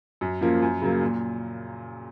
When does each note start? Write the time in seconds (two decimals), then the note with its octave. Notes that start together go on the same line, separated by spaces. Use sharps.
0.21 F#2
0.41 F3 A#3 C#4 F4
0.62 F#2
0.82 C#3 F#3 A#3
1.01 A#2